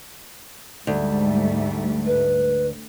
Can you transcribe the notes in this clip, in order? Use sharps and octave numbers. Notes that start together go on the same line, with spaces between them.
D2 G#2 G3 A3
B4